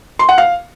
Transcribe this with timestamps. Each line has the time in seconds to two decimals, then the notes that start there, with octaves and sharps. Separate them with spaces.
0.19 C6
0.29 F#5
0.38 F5